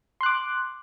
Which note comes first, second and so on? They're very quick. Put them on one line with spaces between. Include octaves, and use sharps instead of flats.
C6 F#6 D6